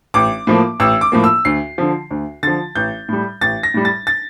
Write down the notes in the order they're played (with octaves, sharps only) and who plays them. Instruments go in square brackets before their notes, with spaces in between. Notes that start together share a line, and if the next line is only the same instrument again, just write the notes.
[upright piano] A1 D6
A2 F3 A#3
A1 E6
D6
A2 F3 A#3
E6
D2 C7
D3 F3
D2
D3 F3 A6
A1 G6
A2 G3
A1 A6
A#6
A2 G3
A6
A6